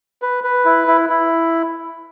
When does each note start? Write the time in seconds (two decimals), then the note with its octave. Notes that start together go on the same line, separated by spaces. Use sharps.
0.22 B4
0.44 B4
0.65 E4
0.88 E4
1.09 E4